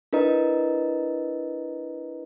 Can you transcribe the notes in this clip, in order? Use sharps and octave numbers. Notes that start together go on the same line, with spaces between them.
D4 E4 A#4 B4 D#5 A#5